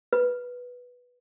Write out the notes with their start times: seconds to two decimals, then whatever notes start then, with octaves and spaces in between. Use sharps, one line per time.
0.13 B4